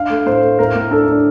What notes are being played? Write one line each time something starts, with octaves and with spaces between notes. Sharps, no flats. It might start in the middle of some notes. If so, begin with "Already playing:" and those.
Already playing: D4 F5
A3
A2 C5
A3
A2 A#4
A2
D4 A4
D4